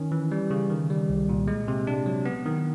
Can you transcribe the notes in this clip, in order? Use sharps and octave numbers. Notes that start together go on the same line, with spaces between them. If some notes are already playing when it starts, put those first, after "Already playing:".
Already playing: D#3 C#4
E3
G3
C#3
D#3
G3
C2
A#2
G#3
C3
D4
F#3
B3
D#3